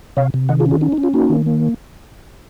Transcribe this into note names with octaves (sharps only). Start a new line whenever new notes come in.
C3 C#5 F5
C3
D#3 D#5 F#5
F4 G#4
C#4
F4 G#4
C#4 D#4
D#4
C#4
F4
A#3 D#4 F#4
D#3
A#3